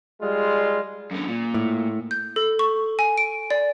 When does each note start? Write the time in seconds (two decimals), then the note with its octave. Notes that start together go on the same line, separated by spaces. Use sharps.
0.22 G3 G#3 F4
1.11 F#2 D3
1.28 A#2
1.54 A2
2.11 G6
2.36 A4
2.59 C#6
2.99 G#5
3.18 D7
3.50 D5